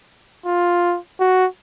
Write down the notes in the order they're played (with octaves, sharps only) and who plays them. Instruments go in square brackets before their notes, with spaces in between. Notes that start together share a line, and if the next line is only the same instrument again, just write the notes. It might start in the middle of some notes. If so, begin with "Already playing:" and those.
[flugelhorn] F4
F#4